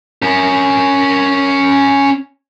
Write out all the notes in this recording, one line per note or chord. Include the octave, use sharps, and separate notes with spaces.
C#4 A#4